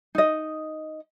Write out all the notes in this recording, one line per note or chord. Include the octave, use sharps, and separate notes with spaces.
D#4 D#5